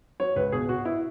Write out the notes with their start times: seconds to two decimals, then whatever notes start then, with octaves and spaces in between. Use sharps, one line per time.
0.20 F#3 C#5
0.36 C#2 B4
0.52 B2 G#4
0.69 B2 F#4
0.85 E4